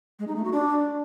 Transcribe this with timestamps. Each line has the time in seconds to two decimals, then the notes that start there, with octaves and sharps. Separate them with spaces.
0.19 G#3
0.27 D#4
0.36 A3
0.44 F#4
0.52 D4